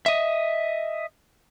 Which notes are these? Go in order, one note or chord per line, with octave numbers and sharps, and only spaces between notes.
D#5 E5